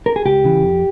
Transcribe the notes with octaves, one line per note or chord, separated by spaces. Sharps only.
A#4
G#4
C#2 G4
C#3 E3
F2